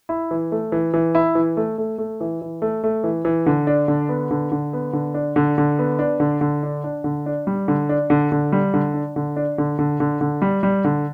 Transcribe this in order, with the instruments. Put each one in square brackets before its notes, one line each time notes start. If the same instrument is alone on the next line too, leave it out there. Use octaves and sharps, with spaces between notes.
[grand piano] E4
E3
A3
E3
E3
E4
E3
A3
A3
A3
E3
E3
A3
A3
E3
E3
D3
D4
D3
B3
D3
D3
B3
D3
D4
D3
D3
B3
D4
D3
D3
D4
D4
D3
D4
G3
D3
D4
D3
D3
G3
D3
D4
D3
D4
D3
D3
D3
D3
G3
G3
D3